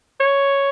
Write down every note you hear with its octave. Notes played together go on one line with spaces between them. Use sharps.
C#5